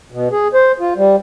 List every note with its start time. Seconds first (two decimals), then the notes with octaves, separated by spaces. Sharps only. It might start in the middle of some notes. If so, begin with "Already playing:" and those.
0.12 B2
0.32 G#4
0.54 C5
0.80 F4
0.96 G3